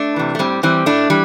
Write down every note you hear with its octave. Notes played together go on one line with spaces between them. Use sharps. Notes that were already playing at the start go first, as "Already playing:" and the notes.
Already playing: A3 D4
C3 E3
A3
A2 G3 C4
E3 G3 C4
A2 A3 D4
E3 G3